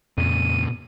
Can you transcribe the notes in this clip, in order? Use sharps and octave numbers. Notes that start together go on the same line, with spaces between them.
F2 A#2 C#3 D#7